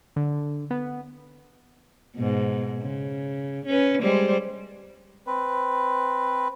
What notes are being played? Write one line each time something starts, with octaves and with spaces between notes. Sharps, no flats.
D3
B3
G#2 B2
C#3
C#4 B4
G3 G#3 C5
C4 B4